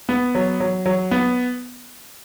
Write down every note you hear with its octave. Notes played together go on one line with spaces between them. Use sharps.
B3
F#3
F#3
F#3
B3